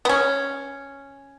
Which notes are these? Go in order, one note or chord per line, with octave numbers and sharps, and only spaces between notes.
B3
C#4